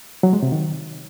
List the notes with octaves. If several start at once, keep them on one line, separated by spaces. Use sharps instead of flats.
F#3
G#3
C3
D#3